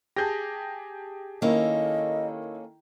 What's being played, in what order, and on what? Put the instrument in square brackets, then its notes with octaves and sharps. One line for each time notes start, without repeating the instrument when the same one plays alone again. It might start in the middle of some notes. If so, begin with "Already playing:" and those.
[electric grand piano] G4 G#4 [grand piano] A5 G6 A#6
[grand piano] D#3 E4 [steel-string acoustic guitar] A#3 C#4 A4 [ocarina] D#5